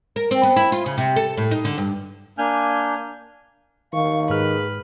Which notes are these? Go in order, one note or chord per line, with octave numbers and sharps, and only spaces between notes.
A#4
C4
B3
E4
F4
C#3
C3
A4
A2
D#4
D3
G2
A#3 D4 G#5 F6 G6
D#3 F5 C#6
G#2 G#4 B4 F6